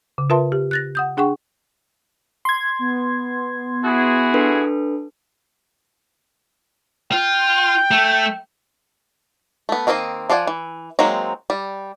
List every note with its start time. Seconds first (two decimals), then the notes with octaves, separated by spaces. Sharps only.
0.18 C#3
0.30 F4 A#4 B4 E5 A5 C6
0.52 G4
0.71 F#6 A6 A#6
0.95 F#5 D#6 G6
1.17 D4 G#4 F#5 G5 C#6
2.45 C6 G#6
2.79 B3
3.84 E4 F#4 G#4
4.34 D4 A4 B4
7.12 F4 G5
7.91 A3
9.69 A3 B3
9.87 D#3 A#3 C4 D4 D#5
10.30 F3 F4 D5 F#5 G#5
10.47 E3
10.99 F#3 G#3 A#3 C4 D#4
11.50 G3